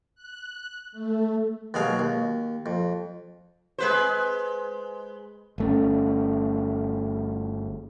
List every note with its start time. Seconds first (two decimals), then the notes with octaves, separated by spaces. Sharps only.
0.15 F#6
0.92 A3
1.74 D#2 B2 F#3 G#3 G#4 F5
1.99 D#2
2.66 F2
3.78 G#3 B4 C5
5.58 G1 A3 C#4